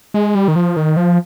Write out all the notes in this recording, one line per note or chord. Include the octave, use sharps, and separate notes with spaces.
G#3
G3
D#3
F3
D#3
F3